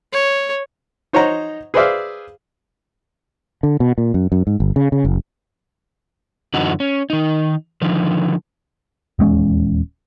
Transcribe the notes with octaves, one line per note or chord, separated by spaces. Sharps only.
C#5
D#4 C5 C#5 D#5 F#5 A#5
G#4 B4 C5 D5 E5 F5
D3
B2
A#2
F#2
F#2
G#2
G1
C#3
C#3
F#1
F#2 D3 E3 D#4 F#4
C#4
D#3 D#4
D3 D#3 F3
D#1 E2 G#3 C#4